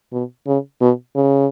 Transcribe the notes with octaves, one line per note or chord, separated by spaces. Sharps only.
B2
C#3
B2
C#3